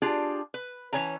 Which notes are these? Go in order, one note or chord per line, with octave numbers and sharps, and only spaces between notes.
D4 F4 G4 G#4
B4
E3 C#4 C#5 G#5 A#5